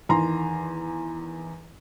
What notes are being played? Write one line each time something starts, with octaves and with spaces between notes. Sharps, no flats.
E2 D#3 A#5 C6